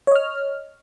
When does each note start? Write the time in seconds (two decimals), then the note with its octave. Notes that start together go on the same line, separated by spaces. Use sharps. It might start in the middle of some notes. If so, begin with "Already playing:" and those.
0.07 C#5
0.11 D#5
0.16 F6